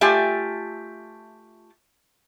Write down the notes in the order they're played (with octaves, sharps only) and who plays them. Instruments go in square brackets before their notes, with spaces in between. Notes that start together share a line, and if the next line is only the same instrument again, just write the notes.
[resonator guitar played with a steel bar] A3 F4 G4 D5 E5 G#5